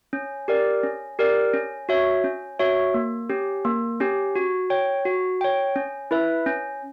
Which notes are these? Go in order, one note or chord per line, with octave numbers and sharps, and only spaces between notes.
C#4
G4 A#4 D5
C#4
G4 A#4 D5
C#4
F#4 C#5 E5
C#4
F#4 C#5 E5
A#3
C#4 G4
A#3
C#4 G4
F#4
C#5 G5
F#4
C#5 G5
C#4
E4 B4 E5
C#4